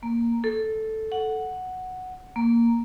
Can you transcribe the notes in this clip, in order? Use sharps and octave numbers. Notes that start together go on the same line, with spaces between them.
A#3
A4
F#5
A#3